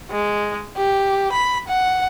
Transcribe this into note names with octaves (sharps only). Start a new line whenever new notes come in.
G#3
G4
B5
F#5